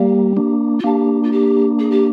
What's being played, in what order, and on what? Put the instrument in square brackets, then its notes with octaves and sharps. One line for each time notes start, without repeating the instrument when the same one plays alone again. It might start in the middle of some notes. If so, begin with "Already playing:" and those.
Already playing: [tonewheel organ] G3 A#3 [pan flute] G4
[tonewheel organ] A#3 D4
[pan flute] F4
[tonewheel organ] A#3 D4 [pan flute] G4
[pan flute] F4
G4
G#4
G4